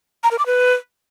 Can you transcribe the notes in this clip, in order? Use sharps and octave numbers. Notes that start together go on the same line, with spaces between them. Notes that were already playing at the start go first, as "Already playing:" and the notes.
A#5
A#4
D6
B4